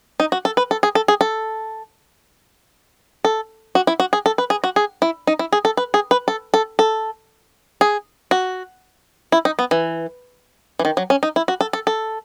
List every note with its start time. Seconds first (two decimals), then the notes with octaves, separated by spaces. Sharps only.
0.20 D#4
0.32 F#4
0.45 A4
0.57 B4
0.71 A4
0.83 G#4
0.95 A4
1.08 G#4
1.21 A4
3.25 A4
3.75 F#4
3.87 E4
4.00 F#4
4.13 G#4
4.26 A4
4.38 B4
4.50 G#4
4.64 F#4
4.76 G#4
5.02 E4
5.27 D#4
5.39 E4
5.52 G#4
5.65 A4
5.77 B4
5.94 G#4
6.11 B4
6.28 A4
6.54 A4
6.79 A4
7.81 G#4
8.31 F#4
9.32 E4
9.45 D#4
9.59 B3
9.71 E3
10.79 E3
10.85 D#3
10.97 F#3
11.10 C#4
11.23 D#4
11.36 E4
11.48 F#4
11.61 A4
11.73 A4
11.87 A4